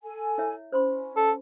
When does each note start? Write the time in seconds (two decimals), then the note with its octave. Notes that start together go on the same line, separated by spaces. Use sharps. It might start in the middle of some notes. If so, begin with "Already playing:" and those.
0.03 A4 G#5
0.38 E4 C#5 E5
0.72 C#4 C5 B5 C6
1.17 A4